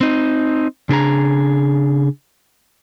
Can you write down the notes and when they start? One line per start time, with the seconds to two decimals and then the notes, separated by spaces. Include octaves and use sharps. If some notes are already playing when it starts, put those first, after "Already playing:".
0.01 C4 D#4
0.89 C#3 D4 G#4 A#5